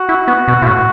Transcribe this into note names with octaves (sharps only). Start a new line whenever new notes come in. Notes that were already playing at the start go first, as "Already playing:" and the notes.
Already playing: F#4
E4
B3
B2
B2 E4
A2 F#4